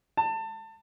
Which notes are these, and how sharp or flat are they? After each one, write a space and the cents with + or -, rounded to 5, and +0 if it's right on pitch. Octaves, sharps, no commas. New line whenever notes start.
A5 +25